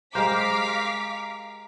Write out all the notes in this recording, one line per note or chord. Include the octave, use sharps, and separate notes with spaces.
G#3 G4 A#4 C5 F5 D6 B6